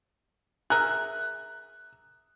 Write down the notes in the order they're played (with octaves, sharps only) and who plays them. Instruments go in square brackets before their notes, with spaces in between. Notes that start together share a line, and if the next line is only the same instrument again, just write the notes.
[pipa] G#4 A#4 E5 [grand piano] F#6